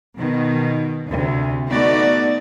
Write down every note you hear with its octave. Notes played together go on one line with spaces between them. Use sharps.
B2 D#3
D2 C3
A3 B3 D#4 F#4 D5